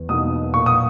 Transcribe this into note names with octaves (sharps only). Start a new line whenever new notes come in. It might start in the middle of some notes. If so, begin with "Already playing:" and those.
Already playing: E2
B2 A#3 D#4 D#6
A#2 C#6
D#6